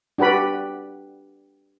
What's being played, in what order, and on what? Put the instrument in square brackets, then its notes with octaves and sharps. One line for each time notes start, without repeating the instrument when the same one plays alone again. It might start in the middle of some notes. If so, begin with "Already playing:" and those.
[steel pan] D4 F#4 G4 B4 B5